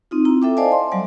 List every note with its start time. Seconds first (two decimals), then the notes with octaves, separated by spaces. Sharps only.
0.11 C4 D#4 F4
0.25 C4 E4 A#5
0.42 A4 E5 G5 D6
0.57 C5 D5 D#5 F5 G#5 A5
0.72 C6
0.92 F#3 G3 D5 F#5